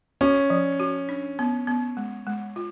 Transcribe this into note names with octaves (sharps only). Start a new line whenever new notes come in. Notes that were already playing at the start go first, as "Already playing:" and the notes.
C#4 F#4
F3
F#4
D4
B3
B3
G#3
G#3
F4